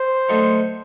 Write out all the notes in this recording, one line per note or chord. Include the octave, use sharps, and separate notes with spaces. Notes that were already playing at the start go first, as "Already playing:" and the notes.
Already playing: C5
D2 D3 F#3 A3 D#4